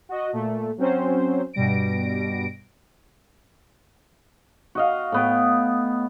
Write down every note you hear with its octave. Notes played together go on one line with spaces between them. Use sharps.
F#4 D#5
A#2 A3
F#3 C4 C#4 C5
G2 B2 G3 A#6 D7
F#4 D#5 F5
A2 B3 G5